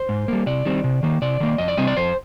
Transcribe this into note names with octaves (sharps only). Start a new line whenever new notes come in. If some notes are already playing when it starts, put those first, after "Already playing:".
Already playing: C5
G#2
G3 A#3
C3 D5
D#3 G3 C4
C3
D#3 A#3
C3 D5
D#3 A#3
F2 D#5
D5
C3 G3 C4 D#5
D5
F2 C5